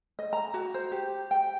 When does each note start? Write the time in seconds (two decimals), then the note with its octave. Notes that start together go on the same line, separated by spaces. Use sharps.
0.19 D#5
0.33 A#5
0.54 F#4
0.74 C5
0.92 G4
1.31 G5